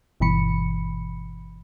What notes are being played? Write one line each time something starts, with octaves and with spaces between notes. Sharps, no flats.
G1 G2 B2 E3 B5 C#7